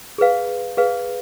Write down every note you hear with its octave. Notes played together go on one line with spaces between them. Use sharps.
G#4 B4 F5
G#4 B4 F5